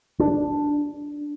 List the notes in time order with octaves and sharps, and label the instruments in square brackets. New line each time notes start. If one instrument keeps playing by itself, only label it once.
[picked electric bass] D4